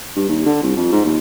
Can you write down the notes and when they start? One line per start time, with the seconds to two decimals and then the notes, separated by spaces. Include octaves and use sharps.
0.16 G2
0.28 D#2
0.46 D3
0.63 C2
0.77 F2
0.92 G#2
1.05 D#2